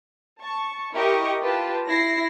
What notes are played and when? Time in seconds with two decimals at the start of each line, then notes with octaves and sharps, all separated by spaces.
0.40 A5 C#6
0.94 E4 G4 A#4 D#5 C#6
1.41 F4 G4 B4 A5
1.88 E4 A#6 C7